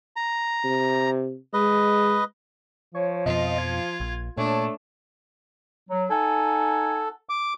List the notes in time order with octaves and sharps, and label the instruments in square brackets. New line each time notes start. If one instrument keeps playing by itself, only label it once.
[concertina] A#5
[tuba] C3
[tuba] G#3 [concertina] B4 D#5
[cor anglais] F3 [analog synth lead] C#5
[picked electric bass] F2 B2 [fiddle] F4 [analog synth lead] D#5
[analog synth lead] G#6
[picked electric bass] A#1
[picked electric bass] A#2 [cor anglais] A3 [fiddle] D4 [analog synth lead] C#5
[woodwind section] F#3
[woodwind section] D#4 F#5 G#5 [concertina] A4
[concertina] D6